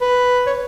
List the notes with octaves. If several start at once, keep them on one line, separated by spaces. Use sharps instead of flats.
B4
C#5